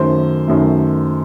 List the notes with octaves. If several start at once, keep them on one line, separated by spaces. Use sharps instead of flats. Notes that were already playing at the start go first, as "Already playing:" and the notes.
Already playing: F#2 D#3 F#3 A3 C5
F#2 D#3 F#3 A3